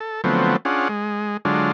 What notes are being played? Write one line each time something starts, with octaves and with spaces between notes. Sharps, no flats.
A4
D3 F3 F#3 A3 B3 C4
C#4 D4 F4 G#4 F#5
G#3
D3 F#3 G#3 D4 F4